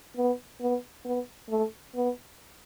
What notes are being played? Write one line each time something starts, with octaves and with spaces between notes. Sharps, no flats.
B3
B3
B3
A3
B3